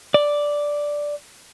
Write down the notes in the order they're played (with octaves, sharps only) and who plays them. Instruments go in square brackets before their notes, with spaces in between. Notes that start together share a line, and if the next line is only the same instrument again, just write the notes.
[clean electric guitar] D5